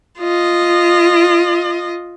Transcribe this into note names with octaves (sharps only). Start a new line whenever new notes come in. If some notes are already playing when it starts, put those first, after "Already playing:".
F4 D#5